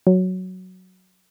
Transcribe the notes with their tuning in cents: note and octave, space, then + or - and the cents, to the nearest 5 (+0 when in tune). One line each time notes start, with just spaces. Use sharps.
F#3 +0